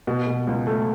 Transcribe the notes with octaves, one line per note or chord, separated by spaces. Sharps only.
B2
B2
C#2
A3